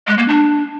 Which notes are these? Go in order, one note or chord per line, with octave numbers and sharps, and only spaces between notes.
G#3
A#3
D4